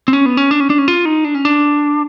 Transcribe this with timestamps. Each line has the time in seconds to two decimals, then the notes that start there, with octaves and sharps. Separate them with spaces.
0.08 C4
0.13 C#4
0.26 B3
0.37 C#4
0.51 D4
0.60 C#4
0.70 D4
0.78 C#4
0.88 F4
1.05 D#4
1.24 D4
1.34 C#4
1.45 D4